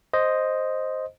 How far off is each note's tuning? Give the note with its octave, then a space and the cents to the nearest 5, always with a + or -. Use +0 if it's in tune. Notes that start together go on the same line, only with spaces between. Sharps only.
C5 +0 D#5 +0